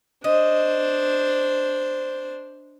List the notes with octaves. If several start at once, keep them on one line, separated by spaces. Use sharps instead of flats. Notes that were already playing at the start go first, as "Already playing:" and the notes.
D4 C5 D#5